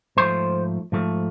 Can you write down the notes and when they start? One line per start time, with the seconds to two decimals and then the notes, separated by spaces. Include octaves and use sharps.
0.17 G#2 F3 A3 C5
0.92 G#2 F3 A3